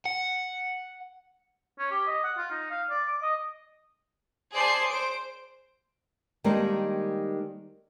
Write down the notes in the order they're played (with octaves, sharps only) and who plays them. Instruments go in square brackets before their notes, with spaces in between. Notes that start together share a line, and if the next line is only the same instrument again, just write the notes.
[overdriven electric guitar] F#5
[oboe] C#4
G4
D#5
F#5
F4
D#4
F5
D5
D6
D#5
[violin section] G#4 C5 D5 A5 C7
C5 D7
[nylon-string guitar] D#3 G3 G#3 A#3 C4 D4